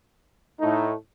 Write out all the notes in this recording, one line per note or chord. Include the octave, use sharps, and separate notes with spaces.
A2 A3 D#4